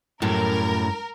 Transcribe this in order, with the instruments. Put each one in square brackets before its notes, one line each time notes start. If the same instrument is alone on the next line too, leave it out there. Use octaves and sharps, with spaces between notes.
[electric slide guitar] F#2 [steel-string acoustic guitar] A2 G3 [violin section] A#4